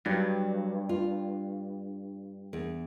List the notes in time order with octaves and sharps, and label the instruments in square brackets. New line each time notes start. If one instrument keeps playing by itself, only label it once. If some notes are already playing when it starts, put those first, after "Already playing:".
[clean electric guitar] G2 [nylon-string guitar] F#3
[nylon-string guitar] F4
E2